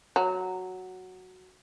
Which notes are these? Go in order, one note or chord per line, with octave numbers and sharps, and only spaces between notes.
F#3